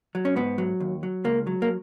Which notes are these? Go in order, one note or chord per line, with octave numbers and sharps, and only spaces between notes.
F#3
C#4
G#2 B3
F#3
D#2
F#3
C#2 A#3
F#3
A#3